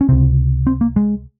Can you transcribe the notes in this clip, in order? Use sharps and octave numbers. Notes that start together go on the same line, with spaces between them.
C#4
C#2 C3 C4
C4
A#3
G#3